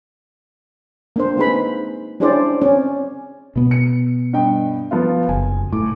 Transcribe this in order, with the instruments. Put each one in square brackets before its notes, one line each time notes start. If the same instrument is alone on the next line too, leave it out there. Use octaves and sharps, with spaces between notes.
[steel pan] A#3 D4 C5
A#3 C4 D#4 G#4 B4 B5
C#4 D4 E4 G#4 C5 D5
C4 C#4
[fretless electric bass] B2 B3
[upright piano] C#7
G2 D#5 G5
F3 B3 F4
[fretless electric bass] F#1 [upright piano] G#5
[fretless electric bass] A2 [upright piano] D6